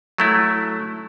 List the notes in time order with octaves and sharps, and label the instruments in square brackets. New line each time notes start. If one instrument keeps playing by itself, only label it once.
[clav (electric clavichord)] F#3 A3 E4